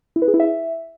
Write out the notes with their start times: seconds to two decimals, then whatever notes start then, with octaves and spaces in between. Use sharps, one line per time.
0.16 E4
0.22 B4
0.28 G#4
0.34 E4
0.40 E5